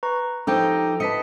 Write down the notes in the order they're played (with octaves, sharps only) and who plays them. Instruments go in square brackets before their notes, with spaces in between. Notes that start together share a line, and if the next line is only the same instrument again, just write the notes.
[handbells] B4 A#5 C#6
[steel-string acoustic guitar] F3 D#4 G4 [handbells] A4 G5
[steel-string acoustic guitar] B4 D#5 [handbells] A5 B6 C#7